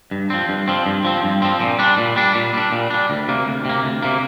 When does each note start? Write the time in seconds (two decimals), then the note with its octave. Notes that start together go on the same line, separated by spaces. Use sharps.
0.11 G2
0.30 F3 C4
0.49 G2
0.68 F3 C4
0.86 G2
1.05 F3 C4
1.23 G2
1.42 F3 C4
1.61 A#2
1.79 G3 D4
1.98 A#2
2.16 G3 D4
2.35 A#2
2.54 G3 D4
2.72 A#2
2.90 G3 D4
3.10 D2
3.28 C3 A#3
3.46 D2
3.65 C3 A#3
3.84 D2
4.03 C3 A#3